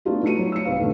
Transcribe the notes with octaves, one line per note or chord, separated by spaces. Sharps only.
A3 B3 D4 D#4 F4 G4
A3 D#4 F#4 C#7 D#7
F#3 C#5
E6 C#7
C2 D#4 B4 F5
F2 A2 D3 A3